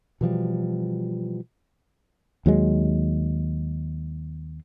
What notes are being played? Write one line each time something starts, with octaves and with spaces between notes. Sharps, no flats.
B2 E3 F3 G3
D#2 F#3 G#3